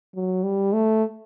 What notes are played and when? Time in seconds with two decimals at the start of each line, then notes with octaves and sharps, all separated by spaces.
0.15 F#3
0.43 G3
0.73 A3